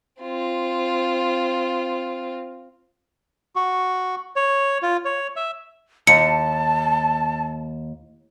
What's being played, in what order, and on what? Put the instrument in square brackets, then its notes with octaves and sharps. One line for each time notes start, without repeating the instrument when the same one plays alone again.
[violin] C4 F4
[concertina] F#4
C#5
F4
C#5
E5
[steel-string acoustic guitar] D#2 [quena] A5 [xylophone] C#7